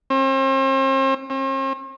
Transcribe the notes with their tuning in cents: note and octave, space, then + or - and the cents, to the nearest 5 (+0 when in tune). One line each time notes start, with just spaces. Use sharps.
C4 +40
C4 +45